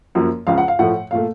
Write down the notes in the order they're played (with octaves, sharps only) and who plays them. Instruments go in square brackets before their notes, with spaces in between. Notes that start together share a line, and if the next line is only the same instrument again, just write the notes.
[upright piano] F#2 F3 A#3
C#2 C#3 F3 F5
F#5
F5
A2 F3 A3 F#5
A#2 A3 F5